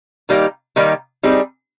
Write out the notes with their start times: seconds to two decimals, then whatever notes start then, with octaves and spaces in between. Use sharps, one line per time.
0.29 D#3 G3 A#3 D#4 G4
0.76 D#3 G3 A#3 D#4 G4
1.23 G3 C4 D#4 G#4